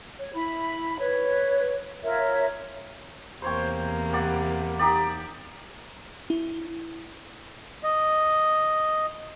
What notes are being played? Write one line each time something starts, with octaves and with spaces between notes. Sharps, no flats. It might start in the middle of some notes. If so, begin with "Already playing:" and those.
C#5
E4 B5
B4 C#5
F4 A#4 C#5 E5
E2 C3 A#3 C5 C#5 G5
G3 D5 F#5
D#4 G4 D5
E4
D#5